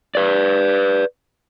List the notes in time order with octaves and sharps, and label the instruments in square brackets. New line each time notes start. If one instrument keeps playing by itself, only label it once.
[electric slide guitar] B4 D5